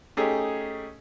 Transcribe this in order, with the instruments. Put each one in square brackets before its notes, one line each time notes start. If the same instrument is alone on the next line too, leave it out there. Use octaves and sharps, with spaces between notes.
[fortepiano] A3 C#4 D#4 G4 G#4